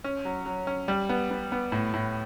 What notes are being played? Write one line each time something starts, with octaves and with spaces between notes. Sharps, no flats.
C#4
F#3
F#3
C#4
G3
B3
B3
B3
A2
A2